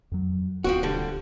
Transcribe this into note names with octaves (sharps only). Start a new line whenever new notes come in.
F2 F#3
D1 F3 C4 F#4
D3 G3